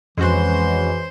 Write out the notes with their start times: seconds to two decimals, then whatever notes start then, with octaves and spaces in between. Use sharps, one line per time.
0.18 F2 E3 G#3 C#4 F#4 C5 C6